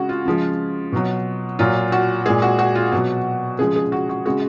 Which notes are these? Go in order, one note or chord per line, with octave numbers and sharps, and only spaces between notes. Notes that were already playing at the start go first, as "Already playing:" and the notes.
Already playing: C#3 G#3 F#4 G#4
F4
C#3 F3 G#3
B2 F#3
A#2 F#3 F4
F#4
A#2 G#3 G#4
F#4
F#4
F4
B2 F#3 F#4
C#3 F3 G#3 G#4
G#4
F#4
F#4
C#3 G#3 F#4